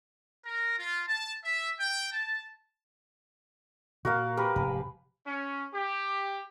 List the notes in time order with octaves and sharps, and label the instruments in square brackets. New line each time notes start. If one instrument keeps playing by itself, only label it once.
[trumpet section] A#4
F4
A5
E5
G5
A5
[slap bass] A#2 [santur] F#4 A#4 F5
[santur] G4 A#4 B4
[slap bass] F1 G#2 [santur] B4
[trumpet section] C#4
G4